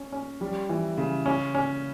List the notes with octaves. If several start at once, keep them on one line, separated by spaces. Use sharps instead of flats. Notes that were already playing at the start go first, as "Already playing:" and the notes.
Already playing: C#4
C#4
G3
E3
C#3
C#4
C#4